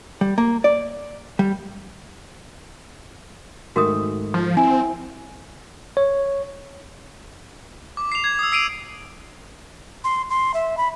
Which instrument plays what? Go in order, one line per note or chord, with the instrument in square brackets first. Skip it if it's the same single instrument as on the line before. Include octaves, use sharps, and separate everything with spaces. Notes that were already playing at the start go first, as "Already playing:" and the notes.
[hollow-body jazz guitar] G3
A#3
D5
G3
[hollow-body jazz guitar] G#2 D#3 A3 [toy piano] F#4 A#4 D#6
[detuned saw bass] F3
[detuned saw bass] C4 [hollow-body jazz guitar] E4 [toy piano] G#5
[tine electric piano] C#5
[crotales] D6
C7 F7
G#6
D#6 E6
E6 C7 D7 D#7 F7
[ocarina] C6
C6
E5
B5